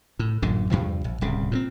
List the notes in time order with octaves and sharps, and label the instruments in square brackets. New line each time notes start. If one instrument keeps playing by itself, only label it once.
[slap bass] A2
A1 F#2 A#2 D3
E2 G2 C3 F3
A#1
D1 C2 C#3
A#2 F3 C4